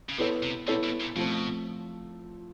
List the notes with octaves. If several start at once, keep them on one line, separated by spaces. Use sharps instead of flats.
C#3
C3 B3 E4 A4 C#5
C3
C3 B3 E4 A4 C#5
B2
A#2
B2 F3 A3 C4